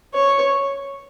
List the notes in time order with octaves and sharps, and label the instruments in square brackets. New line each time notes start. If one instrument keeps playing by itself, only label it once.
[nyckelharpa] C#5